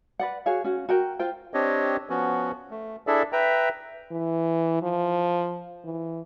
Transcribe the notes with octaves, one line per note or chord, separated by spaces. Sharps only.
B4 D5 F#5
F#4 G#4 C#5 F5
C#4 F#4
F#4 A#4 G5
F4 C5 G5
C4 D4 G4 C#5 D#5
F3 B3 C#4 F#4
A3
D4 E4 G#4 A4 D5 E5
B4 E5 G5 A#5
E3
F3
E3